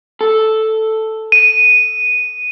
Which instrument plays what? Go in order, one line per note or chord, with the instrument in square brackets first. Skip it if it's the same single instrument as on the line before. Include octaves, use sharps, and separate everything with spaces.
[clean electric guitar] A4
[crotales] D#7